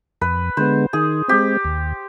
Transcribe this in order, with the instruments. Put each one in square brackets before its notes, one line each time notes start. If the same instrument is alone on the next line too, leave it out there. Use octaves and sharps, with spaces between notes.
[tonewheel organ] F2 [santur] B4
[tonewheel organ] D3 G#3 B3 [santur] C5
[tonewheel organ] D#3 [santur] G#4
[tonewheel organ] G#3 C4 [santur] G4
[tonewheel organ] D#2